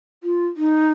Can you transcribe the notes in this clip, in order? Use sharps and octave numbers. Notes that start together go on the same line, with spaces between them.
F4
D#4